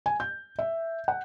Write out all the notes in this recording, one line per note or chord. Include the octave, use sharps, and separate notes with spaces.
G#5
G6
E5
F#5